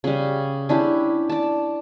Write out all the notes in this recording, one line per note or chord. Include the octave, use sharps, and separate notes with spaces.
C#3 G3
C#4 D4 E4 G4
D5 A5